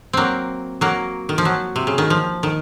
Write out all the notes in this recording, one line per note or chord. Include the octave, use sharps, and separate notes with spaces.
F#3 A#3 C4
F#3 A#3
D#3
F3
F#3
C3
C#3
D#3
F3
D#3